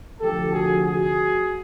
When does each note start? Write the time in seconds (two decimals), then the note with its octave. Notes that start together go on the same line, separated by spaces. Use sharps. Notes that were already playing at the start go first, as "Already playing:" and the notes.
0.20 D2 C3 F3 G4 A4
0.51 F#4 G#4
0.83 F#4 G#4